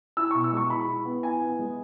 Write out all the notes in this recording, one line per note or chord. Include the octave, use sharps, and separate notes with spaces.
E4 E6
B2 C#6
E6
G#3 C#6
E4 B5
E4
B3
E4 G#5
B3
G#3